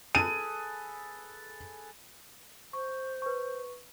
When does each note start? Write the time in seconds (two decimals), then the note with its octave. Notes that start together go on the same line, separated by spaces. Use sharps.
0.15 G#4 A4 B4 D#7
2.73 C5 C#6
3.22 B4 C#6